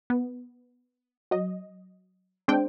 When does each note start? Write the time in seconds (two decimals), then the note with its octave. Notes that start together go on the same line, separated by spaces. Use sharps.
0.10 B3
1.31 F#3 D#5
2.48 G#3 C4 D4 C5 G5